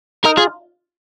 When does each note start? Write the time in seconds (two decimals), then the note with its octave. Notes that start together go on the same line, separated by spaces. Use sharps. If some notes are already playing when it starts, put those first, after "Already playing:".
0.24 D#4 A#4
0.37 F4 G#4